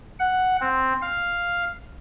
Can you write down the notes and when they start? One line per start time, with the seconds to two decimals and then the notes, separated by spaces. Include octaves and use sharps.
0.19 F#5
0.61 C4
1.02 F5